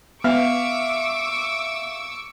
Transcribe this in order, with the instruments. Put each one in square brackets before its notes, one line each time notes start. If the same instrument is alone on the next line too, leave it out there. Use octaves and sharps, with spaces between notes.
[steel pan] B3 [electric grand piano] E5 F5 F6 [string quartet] C#6 D6 E6